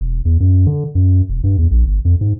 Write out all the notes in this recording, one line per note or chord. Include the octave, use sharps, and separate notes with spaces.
E1
E2
F#2
D3
F#2
E1
G2
E2
A#1
G1
F2
G#2